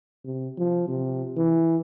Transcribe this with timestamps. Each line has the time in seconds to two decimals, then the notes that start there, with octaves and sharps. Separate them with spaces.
0.25 C3
0.58 F3
0.88 C3
1.37 E3